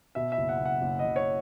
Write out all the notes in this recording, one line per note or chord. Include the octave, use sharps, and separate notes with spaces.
B2 E5
E5
F#1
F#5
F#1
F#5
F#1
D#5
F#1
C#5